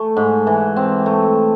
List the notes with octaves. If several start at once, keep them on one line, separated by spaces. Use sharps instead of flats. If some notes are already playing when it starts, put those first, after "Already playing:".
Already playing: A3
G#2
E3
C4
A3